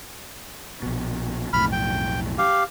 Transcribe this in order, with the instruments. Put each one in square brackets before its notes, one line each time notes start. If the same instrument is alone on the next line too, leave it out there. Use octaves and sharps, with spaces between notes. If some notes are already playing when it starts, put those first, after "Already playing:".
[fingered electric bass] A#1 B2
[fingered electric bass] B1 F2 A2 [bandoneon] B5 F6
[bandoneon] G5
G4 F5